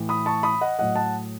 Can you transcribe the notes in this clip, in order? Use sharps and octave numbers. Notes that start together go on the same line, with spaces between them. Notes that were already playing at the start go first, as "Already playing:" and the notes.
Already playing: A2 E3
B5 D#6
A5 C#6
B5 D#6
D#5 F#5
A2 F#3 D#5 F#5
F#5 A5